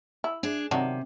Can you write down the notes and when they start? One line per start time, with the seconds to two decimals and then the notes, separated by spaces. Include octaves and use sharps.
0.24 E4
0.43 D4 G#4
0.71 C3 D#3 F#3 D4